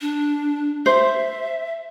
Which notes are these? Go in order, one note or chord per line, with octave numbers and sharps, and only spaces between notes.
D4
C5 E5